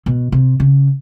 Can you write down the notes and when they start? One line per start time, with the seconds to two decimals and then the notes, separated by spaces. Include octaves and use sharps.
0.06 B2
0.32 C3
0.60 C#3